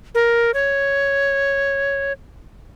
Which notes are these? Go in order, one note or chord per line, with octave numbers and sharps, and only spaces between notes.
A#4
C#5